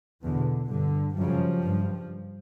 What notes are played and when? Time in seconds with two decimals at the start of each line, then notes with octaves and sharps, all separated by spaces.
0.23 E2 B2 D3
0.70 G2 D3
1.17 F#2 C#3 F3 G3
1.64 G2